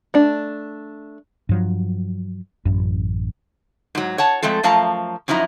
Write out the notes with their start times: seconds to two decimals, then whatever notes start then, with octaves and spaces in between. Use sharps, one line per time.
0.14 A3 D4
1.49 G2 F3 F#3
2.65 A1 F#2
3.95 G#2 F#3
4.18 C#5 F#5 A5
4.42 F3 G#3 A3 C4 A4
4.63 F#2 F3 A3 F5 A5 A#5
5.28 F#2 F3 D#4 E4 A#5